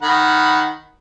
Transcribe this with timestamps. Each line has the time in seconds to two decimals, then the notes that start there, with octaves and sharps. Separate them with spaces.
0.02 D#3 F#5 B5